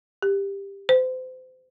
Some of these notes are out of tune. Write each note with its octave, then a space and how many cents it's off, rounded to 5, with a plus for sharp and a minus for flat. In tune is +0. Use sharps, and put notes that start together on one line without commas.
G4 +15
C5 -35